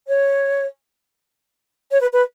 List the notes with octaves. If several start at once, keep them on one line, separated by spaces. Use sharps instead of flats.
C#5
C#5
B4
B4